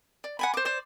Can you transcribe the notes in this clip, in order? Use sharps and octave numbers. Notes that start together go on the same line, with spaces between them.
D5
F#5 G#5 B5
C5 D6
C5 D5